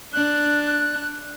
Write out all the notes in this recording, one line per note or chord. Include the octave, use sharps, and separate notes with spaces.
D4 F#6